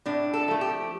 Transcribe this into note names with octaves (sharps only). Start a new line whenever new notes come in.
A2 D4
A4
F3 A3
G4